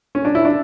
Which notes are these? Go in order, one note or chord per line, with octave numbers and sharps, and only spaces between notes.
C#4
D4
E4
D4